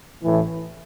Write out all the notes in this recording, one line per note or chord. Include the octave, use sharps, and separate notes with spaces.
A1 A2 E3